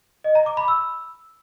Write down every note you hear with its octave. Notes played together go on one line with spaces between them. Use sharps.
D#5
A#5
D6
B5
E6